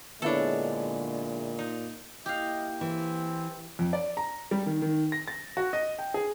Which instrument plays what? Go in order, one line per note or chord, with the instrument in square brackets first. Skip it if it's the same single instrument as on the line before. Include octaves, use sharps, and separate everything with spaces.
[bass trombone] A#2 [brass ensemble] D3 G#3 [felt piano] B3 E4 C#5 [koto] D4 A4
[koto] D#4
[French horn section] A#3 E4 [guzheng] G4 F5 [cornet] D#5
[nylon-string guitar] E3 [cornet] C4
[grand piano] F2
D5
A#5
G3
D#3
D#3
A#6
A6
F#4
D#5
G5
G#4